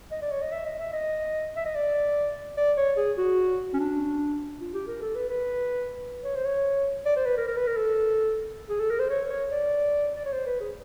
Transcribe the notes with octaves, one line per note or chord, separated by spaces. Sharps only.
D#5
D5
C#5
D#5
E5
D#5
E5
D#5
E5
D#5
D5
D5
C#5
G#4
F#4
C#4
D4
F4
G4
A#4
A4
B4
B4
C#5
C5
C#5
D5
C5
B4
A#4
A#4
B4
A#4
A4
G#4
A4
A#4
C5
C#5
C#5
D5
D5
C#5
C5
B4
G#4